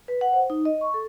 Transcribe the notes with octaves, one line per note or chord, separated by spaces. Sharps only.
B4
F#5
C5
D#4
D#5
C#6
A4